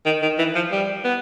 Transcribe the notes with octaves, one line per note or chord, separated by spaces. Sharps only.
D#3
D#3
E3
F3
G3
B3